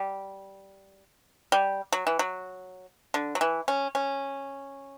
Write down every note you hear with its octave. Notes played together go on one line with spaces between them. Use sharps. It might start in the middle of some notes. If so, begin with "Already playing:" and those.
Already playing: G3
G3
F#3
E3
F#3
D3
F#3
E3
C#4
C#4